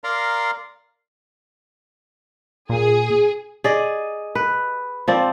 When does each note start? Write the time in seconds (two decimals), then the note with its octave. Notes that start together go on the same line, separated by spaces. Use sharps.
0.04 A#4 D5 F5 A#5 C6
2.69 A#2 G#4
3.64 G#4 D5 D#5
4.35 B4
5.08 F3 C4 D5